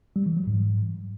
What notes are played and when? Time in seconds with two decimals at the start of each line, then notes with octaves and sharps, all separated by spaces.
0.16 G3
0.26 E3
0.37 F#3
0.47 G#2